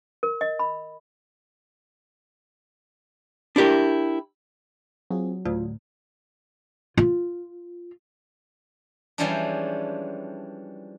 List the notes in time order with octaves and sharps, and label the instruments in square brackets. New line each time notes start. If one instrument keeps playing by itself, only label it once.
[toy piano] A#4
D#5
B5
[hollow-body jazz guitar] D4 E4 G4 A#4
[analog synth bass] F#3 [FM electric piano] C4 F4 G#4
[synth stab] D2 [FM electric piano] A2 [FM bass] F4
[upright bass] F4
[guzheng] E3 F3 G3 G#3 C#4 D4